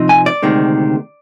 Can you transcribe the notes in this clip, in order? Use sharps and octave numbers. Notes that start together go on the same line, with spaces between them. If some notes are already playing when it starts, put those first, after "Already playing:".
Already playing: C3 F3 C4 D#4
G#5
D5
D2 C3 D#3 G#3